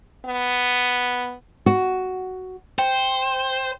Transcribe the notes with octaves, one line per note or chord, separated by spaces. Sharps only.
B3
F#4
C5 G5